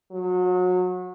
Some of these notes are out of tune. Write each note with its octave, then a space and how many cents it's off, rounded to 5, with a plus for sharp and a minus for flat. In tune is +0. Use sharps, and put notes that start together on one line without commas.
F#3 -30